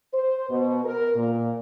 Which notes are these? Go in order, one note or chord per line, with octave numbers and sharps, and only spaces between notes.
C5
B2
A#4
A#2